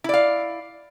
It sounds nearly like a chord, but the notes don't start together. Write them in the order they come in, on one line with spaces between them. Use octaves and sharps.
E4 D5 F5